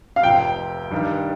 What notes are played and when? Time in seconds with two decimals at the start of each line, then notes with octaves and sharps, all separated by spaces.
0.16 F5
0.23 F1 F2 C3 G5
0.91 G2 D#3 G3 D4